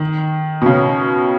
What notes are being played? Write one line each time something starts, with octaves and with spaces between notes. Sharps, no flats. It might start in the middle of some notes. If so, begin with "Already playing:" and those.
Already playing: D#3
B2
C#3